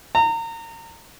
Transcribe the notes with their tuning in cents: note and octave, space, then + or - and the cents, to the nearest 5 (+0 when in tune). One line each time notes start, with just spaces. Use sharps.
A#5 -30